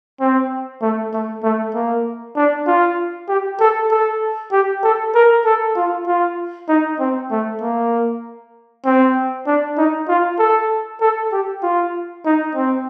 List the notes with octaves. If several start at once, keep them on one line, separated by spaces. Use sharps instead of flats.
C4
A3
A3
A3
A#3
D4
F4
G4
A4
A4
G4
A4
A#4
A4
F4
F4
D#4
C4
A3
A#3
C4
D4
D#4
F4
A4
A4
G4
F4
D#4
C4